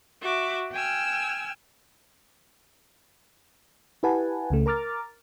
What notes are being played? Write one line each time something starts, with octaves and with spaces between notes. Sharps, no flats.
F#4 E5 D6
G5 G#5 E6 F6
E4 G4 B4 F#5 G#5 A5
C#2 C#3 A3
A#4 A#5 D6 F6 A6